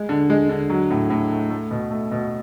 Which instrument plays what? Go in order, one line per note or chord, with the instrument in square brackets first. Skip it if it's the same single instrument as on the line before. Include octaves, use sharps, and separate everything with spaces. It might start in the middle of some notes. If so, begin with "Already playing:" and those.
Already playing: [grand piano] G#3
D3
G#3
D3
F#3
A2
A2
A3
A3
B2
A3
B2